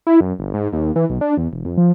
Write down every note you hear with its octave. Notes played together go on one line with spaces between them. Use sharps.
E4
F#2
G1
G#2
D#2
E3
B1
D4
E2
E1
F2
F3